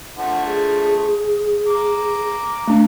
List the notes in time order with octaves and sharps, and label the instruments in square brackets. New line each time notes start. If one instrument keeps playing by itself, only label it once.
[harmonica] D3 F3 A3 [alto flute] F#5
[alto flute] G#4
[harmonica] A#5 D6
[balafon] A3 D4